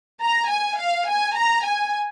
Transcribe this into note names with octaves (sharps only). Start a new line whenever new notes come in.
A#5
G#5
F5
G#5
A#5
G#5